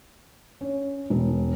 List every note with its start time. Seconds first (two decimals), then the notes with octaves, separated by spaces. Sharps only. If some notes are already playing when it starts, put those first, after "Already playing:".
0.61 C#4
1.10 E1